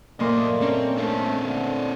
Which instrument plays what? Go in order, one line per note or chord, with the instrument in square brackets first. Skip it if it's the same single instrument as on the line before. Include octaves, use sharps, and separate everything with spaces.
[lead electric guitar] F#2 D#5 [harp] A#2 D#4 C6 [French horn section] A3 A#3 D5
[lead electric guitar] C4 [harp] C#4 C#5
[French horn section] A3 [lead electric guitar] C4 D4
[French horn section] D3